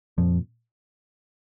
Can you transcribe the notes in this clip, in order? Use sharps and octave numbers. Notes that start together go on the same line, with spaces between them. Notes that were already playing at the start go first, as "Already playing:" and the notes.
F2 A#2 F3